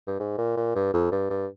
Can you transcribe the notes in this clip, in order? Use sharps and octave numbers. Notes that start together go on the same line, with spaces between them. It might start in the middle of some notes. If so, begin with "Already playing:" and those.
G2
G#2
A#2
A#2
G2
F2
G2
G2